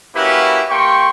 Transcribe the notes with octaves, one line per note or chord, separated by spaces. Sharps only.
A#3 C#4 E4 F#4 G4 B4
A#3 G4 G5 C6 C#6